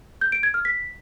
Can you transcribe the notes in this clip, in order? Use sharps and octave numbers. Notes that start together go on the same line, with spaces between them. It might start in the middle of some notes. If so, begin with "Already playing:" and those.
G6
D7
G#6
F6
B6